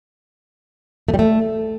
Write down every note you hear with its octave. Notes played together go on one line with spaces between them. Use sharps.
A3
G3
A3